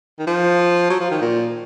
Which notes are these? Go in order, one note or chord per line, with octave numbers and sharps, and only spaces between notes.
D#3
F3
F#3
F3
D#3
A#2